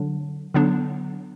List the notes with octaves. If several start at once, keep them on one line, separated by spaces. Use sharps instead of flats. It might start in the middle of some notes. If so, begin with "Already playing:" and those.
Already playing: D3 F#3 D4
D3 F#3 B3 D4